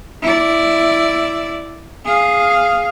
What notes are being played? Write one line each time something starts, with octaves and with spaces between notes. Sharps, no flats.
E4 D5
G#4 F5